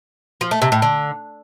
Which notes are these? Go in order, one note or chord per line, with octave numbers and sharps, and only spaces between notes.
F3
A3
C3
A2
D3